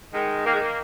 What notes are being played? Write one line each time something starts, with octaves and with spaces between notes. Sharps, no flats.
D#3 G#3
D#3 A#3
G#3
A#3